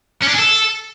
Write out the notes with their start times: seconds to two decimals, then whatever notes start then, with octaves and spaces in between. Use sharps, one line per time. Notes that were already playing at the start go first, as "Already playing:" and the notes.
0.22 C#4
0.28 D4
0.34 G#4
0.39 A4